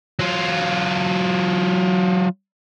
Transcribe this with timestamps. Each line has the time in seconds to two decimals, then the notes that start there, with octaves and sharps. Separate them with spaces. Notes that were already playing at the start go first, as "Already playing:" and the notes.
0.19 F#3 F4